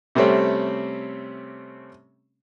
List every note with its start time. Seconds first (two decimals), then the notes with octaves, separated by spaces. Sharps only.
0.15 C3 G3 A3 C4 C#4